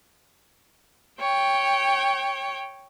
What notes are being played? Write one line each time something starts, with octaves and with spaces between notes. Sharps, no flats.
C#5 G5